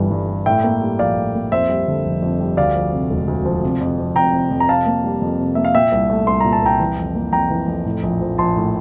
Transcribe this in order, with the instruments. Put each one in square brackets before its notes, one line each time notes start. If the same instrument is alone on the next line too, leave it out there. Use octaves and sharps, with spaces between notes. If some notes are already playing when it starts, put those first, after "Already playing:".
Already playing: [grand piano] G1 G2 E3 G3
G2
G3
A2 E5 G5
A#3
G3
A#1 D5 F5
A2
A#3
F2 C5 E5
G3
D3
F1
F2
G3
D2 D5 F5
F3
C3
E1
D2
F3
C3
F2
F3
F2 G5 A#5
C3
F2
A#5
C3 F5 A5
A#3
G3
F2
C3
A#3 E5
F5
A#2 E5 G5
C2
A3
C2 C6
A#2 A#5
A5
C2 G5 A#5
E3
F2
A#3
F2 G5 A#5
E3
F2
A2
A#1
F3
A#1 A5 C6
A2